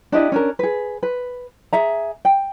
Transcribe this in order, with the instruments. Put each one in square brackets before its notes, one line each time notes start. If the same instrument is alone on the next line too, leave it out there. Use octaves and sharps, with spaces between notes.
[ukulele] D4 E4 G4 D#5
C#4 D4 A#4
G#4 B4
B4
G#4 E5 A#5
G5